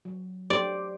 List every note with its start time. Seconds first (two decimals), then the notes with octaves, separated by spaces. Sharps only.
0.05 F#3
0.50 G4 C5 D5